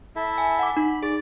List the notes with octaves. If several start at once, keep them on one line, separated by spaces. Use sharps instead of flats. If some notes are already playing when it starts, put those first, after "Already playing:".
E4 A4 E5
G#5
F#5 D6
D#4 B5
G#4 D5